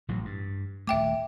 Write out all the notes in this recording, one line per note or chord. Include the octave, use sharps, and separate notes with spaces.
A1 A2 F#3
G2
D#1 A3 E5 G5 D6